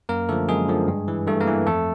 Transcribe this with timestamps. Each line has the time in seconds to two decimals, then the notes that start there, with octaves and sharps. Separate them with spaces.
0.09 F#2 A#3 A#4
0.29 D3 F3 A3 A4
0.49 F#2 G#3 G#4
0.68 D3 F3
0.88 G2
1.08 E3
1.27 G2 A3 A4
1.40 A#3 A#4
1.47 E3
1.66 F2 A3 A4